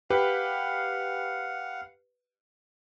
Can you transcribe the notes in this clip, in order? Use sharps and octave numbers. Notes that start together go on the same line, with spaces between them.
G4 B4 F5 F#5